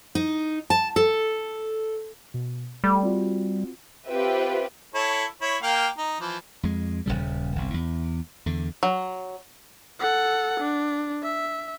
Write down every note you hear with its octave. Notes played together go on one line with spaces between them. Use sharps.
D#4
A5
A4
B2
G3 A3 A4
C4 F4 F#4
C4 F4 G4 B4 E5
E4 A4 C#5
E4 C#5
A#3 F5 G5
D#4
E3 F3
F2 G#3
D#1 G#1 C#3 G3
G1 C2
E2
E2 D3
F#3
A4 F#5
D4
E5